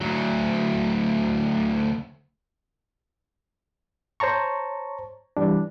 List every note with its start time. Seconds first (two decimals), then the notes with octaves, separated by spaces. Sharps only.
0.01 D2 F#3
4.20 C5 C#5 A5 A#5 C#6
5.37 E3 G3 D4